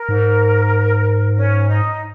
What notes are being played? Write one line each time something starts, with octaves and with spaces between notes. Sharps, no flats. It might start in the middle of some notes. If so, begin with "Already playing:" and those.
Already playing: A#4
G#2
C#4
D#4